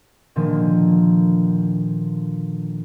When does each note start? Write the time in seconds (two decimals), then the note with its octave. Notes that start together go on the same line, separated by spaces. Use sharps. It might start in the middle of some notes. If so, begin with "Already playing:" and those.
0.36 A#2 D3 D#3 F3 A#3